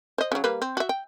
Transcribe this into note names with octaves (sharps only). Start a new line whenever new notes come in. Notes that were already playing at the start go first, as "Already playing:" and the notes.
C5 D#5
C#3 F#3
G3 A#3 B4
C4
F#4 E5
G5